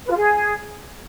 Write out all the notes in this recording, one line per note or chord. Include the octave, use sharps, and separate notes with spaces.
B4
F4
G#4